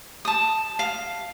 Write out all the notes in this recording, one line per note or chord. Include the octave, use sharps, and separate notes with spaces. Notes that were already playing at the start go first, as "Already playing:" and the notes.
A5 D#6
F5